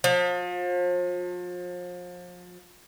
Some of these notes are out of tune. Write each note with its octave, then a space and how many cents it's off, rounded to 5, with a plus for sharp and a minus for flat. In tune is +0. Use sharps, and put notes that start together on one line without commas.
F3 +35